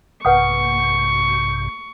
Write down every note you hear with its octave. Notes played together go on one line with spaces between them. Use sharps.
A#1 G2 C3 B4 F#5 C#6 D#6